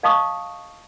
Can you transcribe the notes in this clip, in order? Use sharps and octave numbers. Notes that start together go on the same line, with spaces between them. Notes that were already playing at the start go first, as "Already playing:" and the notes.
D#5 F5 A5 C#6 D#6